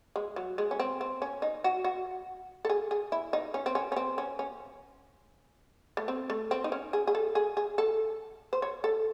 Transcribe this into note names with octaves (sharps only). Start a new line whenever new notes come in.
G#3
F#3
G#3
C#4
C4
C4
C#4
D#4
F#4
F#4
A4
G#4
G#4
E4
D#4
C#4
C4
C#4
C#4
C4
C#4
C#4
A3
C4
A3
C4
D#4
C#4
G#4
G#4
A4
G#4
G#4
A4
C5
C#5
A4